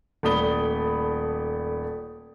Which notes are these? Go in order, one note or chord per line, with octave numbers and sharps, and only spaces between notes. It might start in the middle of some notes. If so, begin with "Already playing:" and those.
D#1 A3 D5 B5 D#6 G7